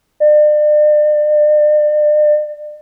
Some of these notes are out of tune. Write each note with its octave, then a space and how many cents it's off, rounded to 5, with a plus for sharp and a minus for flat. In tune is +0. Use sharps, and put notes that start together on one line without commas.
D5 +40